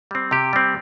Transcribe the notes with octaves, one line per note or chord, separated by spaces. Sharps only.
G3 C4
C3 G4
G3 C4